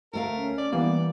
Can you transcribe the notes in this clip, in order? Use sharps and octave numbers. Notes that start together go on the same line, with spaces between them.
D2 A3 A#4 F5
C#4
D5
E3 G3 A#3 B3 D5